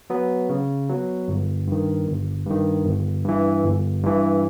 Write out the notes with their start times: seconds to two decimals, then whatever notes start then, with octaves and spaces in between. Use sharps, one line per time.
0.10 F#3 B3
0.49 C#3
0.89 F#3 B3
1.28 G1
1.67 G2 D#3
2.07 G1
2.46 G2 D#3
2.85 G1
3.25 G2 E3
3.64 G1
4.03 G2 E3